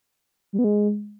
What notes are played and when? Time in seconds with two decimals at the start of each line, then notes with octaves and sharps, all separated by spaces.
0.53 G3
0.59 B3
0.64 G#3